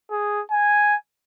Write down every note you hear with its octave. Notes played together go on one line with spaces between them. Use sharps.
G#4
G#5